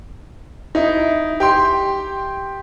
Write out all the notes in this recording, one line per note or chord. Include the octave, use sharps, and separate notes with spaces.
D#4 E4
G4 G5 C6